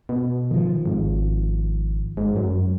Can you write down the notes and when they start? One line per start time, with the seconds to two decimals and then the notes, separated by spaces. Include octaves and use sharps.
0.09 B2
0.51 D#3 F3
0.86 G#1
2.17 G#2
2.36 F#2